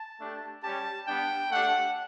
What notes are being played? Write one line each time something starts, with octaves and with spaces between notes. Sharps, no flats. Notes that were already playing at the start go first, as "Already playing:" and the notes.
Already playing: A5
A3 D4 G4
G3 C#4 G4 A5
G3 B3 D4 G5
A3 D4 G4 F#5